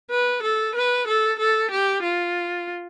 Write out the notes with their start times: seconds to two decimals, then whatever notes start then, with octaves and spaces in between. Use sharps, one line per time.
0.11 B4
0.43 A4
0.76 B4
1.08 A4
1.39 A4
1.71 G4
2.03 F4